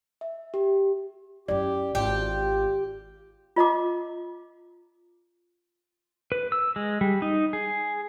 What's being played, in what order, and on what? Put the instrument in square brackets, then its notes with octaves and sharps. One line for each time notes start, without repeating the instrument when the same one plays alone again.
[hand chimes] E5
G4
[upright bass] F#2 E4 [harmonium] G4 [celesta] D5
[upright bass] G#1 [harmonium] F4 [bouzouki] G4
[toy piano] F4 D#5 A#5 D6
[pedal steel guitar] B4
E6
G#3
G3
D#4
G#4